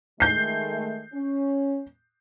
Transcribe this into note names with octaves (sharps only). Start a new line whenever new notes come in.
D#3 G#3 A3 G6 C7
C#4